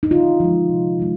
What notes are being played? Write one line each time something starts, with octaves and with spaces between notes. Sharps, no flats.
D#4
D3 F4
F3 G#3
C3
D#3 G#3